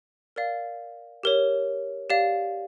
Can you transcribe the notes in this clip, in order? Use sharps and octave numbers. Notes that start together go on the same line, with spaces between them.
A#4 D5 F5
G4 A#4 C#5
G4 D5 F5